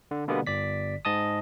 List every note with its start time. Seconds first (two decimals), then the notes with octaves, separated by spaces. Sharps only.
0.11 D3
0.28 B2 D3 G3 A#3 B3
0.47 G1 D5 B6
1.05 G#2 D#5 A5 D#6